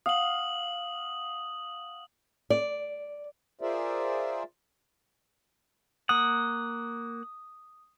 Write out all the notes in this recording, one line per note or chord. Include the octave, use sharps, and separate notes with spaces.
F5 F#5 D#6 F#7
D5
F4 G#4 A#4 C5 D5 E5
A#3 F#5 D#6